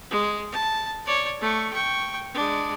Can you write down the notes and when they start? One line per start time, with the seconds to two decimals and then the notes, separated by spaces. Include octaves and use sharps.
0.11 G#3
0.52 A5
1.06 C#5 D5
1.41 A3 C#6
1.72 G5 C#6
2.34 G#3 D4